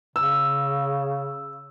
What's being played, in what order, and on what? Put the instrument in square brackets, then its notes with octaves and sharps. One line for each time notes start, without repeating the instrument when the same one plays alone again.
[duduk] C#3 [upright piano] E6